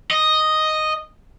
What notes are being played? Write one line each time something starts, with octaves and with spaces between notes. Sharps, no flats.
D#5